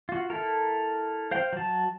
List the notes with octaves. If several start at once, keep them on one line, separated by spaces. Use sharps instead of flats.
F4 F#4
E4 A4 A#4
C5 F5 G5
F#3 A5